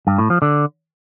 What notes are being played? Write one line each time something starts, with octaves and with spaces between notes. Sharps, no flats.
G2
A2
F3
D3